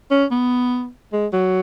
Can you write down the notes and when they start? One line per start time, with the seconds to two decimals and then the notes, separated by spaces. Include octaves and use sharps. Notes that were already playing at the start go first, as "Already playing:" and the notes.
0.11 C#4
0.31 B3
1.12 G#3
1.33 F#3